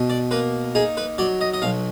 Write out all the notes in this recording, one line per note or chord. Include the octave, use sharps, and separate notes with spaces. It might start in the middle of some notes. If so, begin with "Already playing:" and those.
Already playing: B2
D5
A#3 B4
D#4 G#4
B4
F#3 D5
D#5
D#5
B1 F5